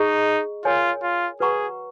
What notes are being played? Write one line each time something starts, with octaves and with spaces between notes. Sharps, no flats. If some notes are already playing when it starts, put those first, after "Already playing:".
Already playing: D#4 G#4 D#5 A#5 C#6
F4 A#4 C#5 G#5
F4
F#4 G#4 B4 F#5 A#5 C#6